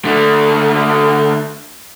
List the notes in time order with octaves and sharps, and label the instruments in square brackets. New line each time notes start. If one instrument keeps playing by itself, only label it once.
[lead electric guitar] D3 A3